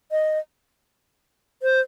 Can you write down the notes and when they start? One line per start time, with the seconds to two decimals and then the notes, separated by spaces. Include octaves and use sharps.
0.11 D#5
1.62 C5